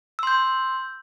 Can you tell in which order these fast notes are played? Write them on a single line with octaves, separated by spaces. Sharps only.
E6 C6 G6